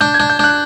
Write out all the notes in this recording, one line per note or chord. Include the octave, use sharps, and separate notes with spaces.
D4 G6
G#6
D4
G6
D4 F#6